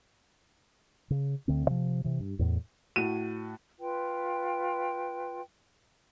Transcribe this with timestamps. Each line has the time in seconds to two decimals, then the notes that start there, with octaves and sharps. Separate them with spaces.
1.10 C#3
1.48 D2 D3 C4
1.67 C3 F3
2.04 C3 E3
2.20 G2
2.39 E2 A2
2.96 A2 F#4 D#7
3.79 F4 B4 G5